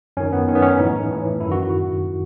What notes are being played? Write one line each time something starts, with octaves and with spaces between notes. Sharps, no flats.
F#2 D#3 C#4
B3
F#2 D#3 C#4
B3
C#4
A2 E3 D#4
A2 E3
F#2 D#3 E4
F#4